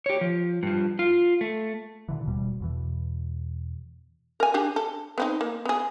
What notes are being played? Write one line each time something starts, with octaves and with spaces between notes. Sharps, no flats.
G4 C#5
F3
G2 F3
F4
A3
B2 D3 E3
D#1 D2 B2 G3
E2 B2 E3
A#4 G#5
D4 G4 G#4
A4
B3 C4 D#4
A#3
B3 G#4